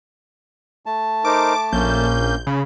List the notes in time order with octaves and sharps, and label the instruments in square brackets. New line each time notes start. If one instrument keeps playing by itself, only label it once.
[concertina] A3 A5
[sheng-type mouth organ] D#4 A#4 C5 [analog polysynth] D6
[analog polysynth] A#1 G6 [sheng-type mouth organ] A#3 C#4
[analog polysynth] C#3 [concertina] B5